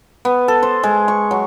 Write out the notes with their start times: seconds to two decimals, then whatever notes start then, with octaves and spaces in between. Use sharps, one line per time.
0.25 B3
0.48 A4
0.63 C5
0.83 G#3
1.08 C#6
1.31 F#3